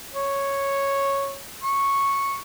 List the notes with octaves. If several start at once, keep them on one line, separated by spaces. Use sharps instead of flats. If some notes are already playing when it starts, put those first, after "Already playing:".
C#5
C#6